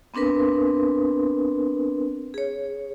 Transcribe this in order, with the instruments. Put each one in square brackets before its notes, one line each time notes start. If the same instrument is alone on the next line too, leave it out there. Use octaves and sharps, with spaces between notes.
[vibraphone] B3 C4 D4 A#4 B4
G#4 C#5